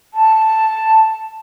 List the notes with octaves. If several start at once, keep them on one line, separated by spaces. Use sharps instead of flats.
A5